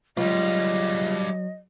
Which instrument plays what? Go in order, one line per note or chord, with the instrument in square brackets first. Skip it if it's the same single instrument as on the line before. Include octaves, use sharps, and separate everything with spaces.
[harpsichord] C#2 [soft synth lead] F#3 [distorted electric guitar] G3 F4 [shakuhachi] D#5